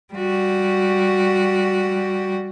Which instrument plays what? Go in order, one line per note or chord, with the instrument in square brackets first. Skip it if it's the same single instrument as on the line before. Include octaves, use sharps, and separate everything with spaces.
[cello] G3 F#4